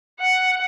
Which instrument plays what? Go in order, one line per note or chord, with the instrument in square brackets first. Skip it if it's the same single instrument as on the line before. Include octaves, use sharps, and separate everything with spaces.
[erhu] F#5